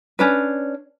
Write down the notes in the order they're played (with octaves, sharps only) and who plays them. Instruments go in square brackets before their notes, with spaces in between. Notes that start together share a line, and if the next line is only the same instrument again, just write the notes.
[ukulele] C#4 D4 B4